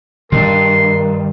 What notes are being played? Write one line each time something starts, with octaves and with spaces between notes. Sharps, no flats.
G2 D#3 D4 A#4 C6